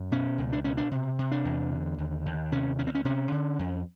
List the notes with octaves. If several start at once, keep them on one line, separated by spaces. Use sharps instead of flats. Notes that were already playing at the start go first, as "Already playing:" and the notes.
Already playing: F#2
B2 C#4
C#2
D4
B2 C#4
D4
C3
C3
D4
E2
D3
D#2
D#2
C3 C#4
D2 C#4
C4
C#4
C3 C#4
D3
F2